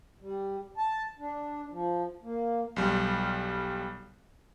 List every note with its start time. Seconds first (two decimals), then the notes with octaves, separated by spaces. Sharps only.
0.21 G3
0.77 A5
1.19 D4
1.70 F3
2.22 A#3
2.76 B1 G3